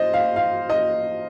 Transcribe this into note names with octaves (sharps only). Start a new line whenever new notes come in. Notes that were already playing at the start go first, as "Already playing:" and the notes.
Already playing: C5 D#5
F5
F5
D#5